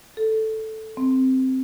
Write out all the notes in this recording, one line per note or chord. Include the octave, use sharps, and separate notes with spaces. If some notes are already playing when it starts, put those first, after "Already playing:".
A4
C4